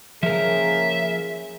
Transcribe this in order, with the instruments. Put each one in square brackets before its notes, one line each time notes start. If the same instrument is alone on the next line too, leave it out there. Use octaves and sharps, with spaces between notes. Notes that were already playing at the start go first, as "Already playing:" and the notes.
[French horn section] C#3 A#3 G#4 [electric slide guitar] F3 A#4 [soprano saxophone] E5